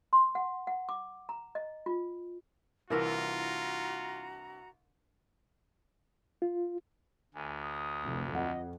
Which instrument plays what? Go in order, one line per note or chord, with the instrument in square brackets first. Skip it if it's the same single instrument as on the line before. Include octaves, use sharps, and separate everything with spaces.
[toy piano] C6
F#5
F#5
D6
A#5
D#5
F4
[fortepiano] C2 E3 [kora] D4 A#4 E5 [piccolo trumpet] F4 [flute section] F#4 A#5
[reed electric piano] F4
[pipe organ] D2 [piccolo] G#5
[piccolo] D#6
[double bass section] F1
[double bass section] F2 [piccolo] D#5 [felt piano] F#5